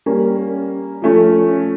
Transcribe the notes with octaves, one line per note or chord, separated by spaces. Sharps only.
G3 A#3 C#4
F3 A3 C#4